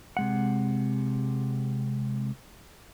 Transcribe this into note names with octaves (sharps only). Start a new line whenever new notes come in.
C3 G#3 F#5